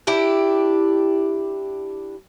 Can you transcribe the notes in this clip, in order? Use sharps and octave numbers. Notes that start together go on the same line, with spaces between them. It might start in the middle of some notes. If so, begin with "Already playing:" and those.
D4 E4 G4